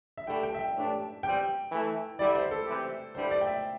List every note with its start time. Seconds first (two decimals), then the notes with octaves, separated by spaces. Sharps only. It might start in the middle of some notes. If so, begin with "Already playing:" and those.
0.17 E5
0.27 G2 D3 A3 E4 G4 G5
0.43 G5
0.54 E5
0.59 G5
0.75 A2 E3 A3 D4 G4
1.23 E3 G3 C4 G4 G5
1.71 E3 A3 E4
2.19 D3 G3 E4 D5
2.35 C5
2.51 A4
2.67 C3 E3 C4 E4 G4
3.15 G2 D3 G3 E4 C5
3.31 D5
3.41 G5
3.47 E5